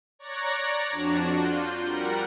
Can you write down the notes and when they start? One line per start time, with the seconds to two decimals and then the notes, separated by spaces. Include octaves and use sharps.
0.19 C#5 D5 A#5 C#6 F#6 A#6
0.91 F2 D4 F#4
1.32 F4 G6
1.83 G3 A#4 F#5